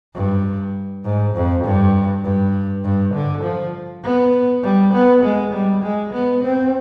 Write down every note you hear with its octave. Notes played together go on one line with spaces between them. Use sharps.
G2
G#2
F2
G2
G2
G2
D3
F3
B3
G3
B3
G#3
G3
G#3
B3
C4